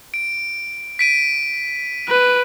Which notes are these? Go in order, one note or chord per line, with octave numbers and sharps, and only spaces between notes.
D7
B6 D7 D#7
B4